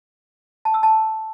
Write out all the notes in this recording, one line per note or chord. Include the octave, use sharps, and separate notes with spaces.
A5
E6
A5